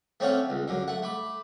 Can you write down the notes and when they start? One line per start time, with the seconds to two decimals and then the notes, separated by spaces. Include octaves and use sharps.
0.20 A3 C4 C#4 D5 F5 F#5
0.50 C#2
0.68 F#2 D3
0.88 A3 F#5
1.03 A3 B5 D6